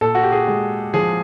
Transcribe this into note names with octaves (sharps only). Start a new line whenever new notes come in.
A#2 A4
F#4
G4
G#4
G#3
F3 G#4